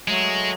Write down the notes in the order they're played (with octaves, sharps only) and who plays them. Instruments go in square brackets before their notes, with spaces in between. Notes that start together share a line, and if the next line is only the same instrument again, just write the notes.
[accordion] F#3 A3 [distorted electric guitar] G#3